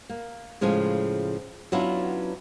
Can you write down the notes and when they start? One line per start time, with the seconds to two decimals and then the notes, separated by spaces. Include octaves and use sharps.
0.09 A#3
0.61 A2 C#3 F3 G#3 G#5
1.72 F#3 B3 C#4 D4 E4 F4